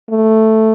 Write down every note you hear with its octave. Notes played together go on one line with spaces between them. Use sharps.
A3